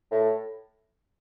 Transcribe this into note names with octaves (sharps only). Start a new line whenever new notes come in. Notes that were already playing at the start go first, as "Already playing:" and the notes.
A2